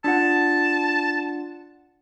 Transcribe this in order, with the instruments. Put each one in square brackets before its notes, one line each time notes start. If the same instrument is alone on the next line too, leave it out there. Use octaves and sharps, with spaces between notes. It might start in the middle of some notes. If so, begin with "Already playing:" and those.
[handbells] D4 F4 F#5 [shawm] A5